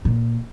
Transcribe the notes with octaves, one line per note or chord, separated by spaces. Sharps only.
A#2